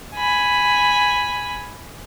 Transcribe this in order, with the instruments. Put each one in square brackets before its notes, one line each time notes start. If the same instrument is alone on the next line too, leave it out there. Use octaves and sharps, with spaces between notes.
[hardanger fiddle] G#5 B5